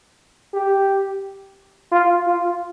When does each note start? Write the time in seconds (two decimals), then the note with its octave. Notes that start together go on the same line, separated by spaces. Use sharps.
0.54 G4
1.92 F4
2.27 F4